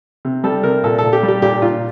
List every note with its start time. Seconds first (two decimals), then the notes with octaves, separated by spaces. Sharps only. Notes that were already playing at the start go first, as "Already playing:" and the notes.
0.25 C3
0.44 G3 A4
0.63 C3 A#4
0.84 A#2 A4
0.98 A4
1.03 A#2
1.13 G4
1.23 G3
1.28 G4
1.42 A#2 G4
1.62 A#2 F4